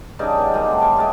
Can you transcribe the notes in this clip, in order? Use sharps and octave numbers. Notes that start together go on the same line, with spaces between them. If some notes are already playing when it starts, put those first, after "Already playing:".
G2 C#3 D#4 D5
B2
E3 F#3 G#3 A#3
A3 C4
G3 C#5 C6 D6
G#3 F4 G4